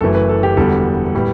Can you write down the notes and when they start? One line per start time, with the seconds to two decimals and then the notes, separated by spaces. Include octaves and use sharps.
0.01 F#1 F#2 E3 A3 A4
0.15 B4
0.29 A4
0.43 G4
0.57 E1 E2 D3 G3 A4
1.15 A2 G3 B3